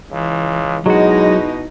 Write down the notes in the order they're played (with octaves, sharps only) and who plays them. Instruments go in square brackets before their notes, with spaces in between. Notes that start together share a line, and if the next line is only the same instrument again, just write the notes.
[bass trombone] C#2 [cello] E3
[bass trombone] B2 [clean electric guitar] F#3 F#4 [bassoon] G#3 [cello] D#4 E4